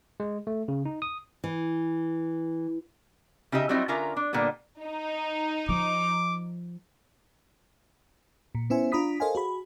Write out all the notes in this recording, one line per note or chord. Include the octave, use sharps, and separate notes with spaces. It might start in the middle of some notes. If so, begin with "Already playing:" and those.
G#3
A3
C#3
D#4
D#6
E3
C#3 D#4 G4 D#5 E5
F#3 G3 C4 D#4 E4
D3 C#4 F4 A#4 E5 A#5
D4
A#2 D3 G3 B3
D#4
F3 D6
A#2
B3 C#4 E4 C5 E5 G#5
D4 F4 A#5 B5 D#6 B6
A4 A#4 C5 D#5 F5 G#5
F#4 G#4 B5